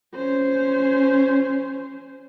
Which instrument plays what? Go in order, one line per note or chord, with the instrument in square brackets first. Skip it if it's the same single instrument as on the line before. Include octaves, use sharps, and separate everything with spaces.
[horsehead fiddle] C#4 C5